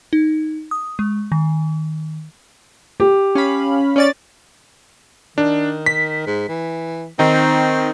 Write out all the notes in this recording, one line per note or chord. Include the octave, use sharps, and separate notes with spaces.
D#4
D#6
G#3
D#3
G4
C#4 F5 B5
C#4 D5 A6
D#3 D4
B6
G#2
E3
D#3 C4 D#4